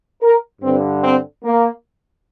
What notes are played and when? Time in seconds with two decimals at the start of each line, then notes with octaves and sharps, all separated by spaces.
0.23 A#4
0.62 G2 D3 C4
1.03 C4
1.43 A#3